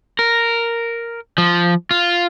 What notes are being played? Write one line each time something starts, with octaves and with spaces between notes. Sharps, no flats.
A#4
F3
F4